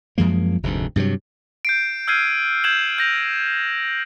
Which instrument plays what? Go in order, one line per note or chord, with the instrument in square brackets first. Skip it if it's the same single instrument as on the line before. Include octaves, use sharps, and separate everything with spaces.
[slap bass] F#2 F3 G#3 A#3
F1 D2 G#2
G2 C3 E3 F#3
[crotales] G6 C7 D7
E6 F6 G6 G#6 C7 D#7
G6 G#6 E7 F#7
G6 A#6 F7